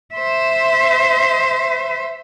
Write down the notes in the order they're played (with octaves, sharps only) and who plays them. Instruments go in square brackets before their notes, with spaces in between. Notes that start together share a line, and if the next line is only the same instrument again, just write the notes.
[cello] C5 E5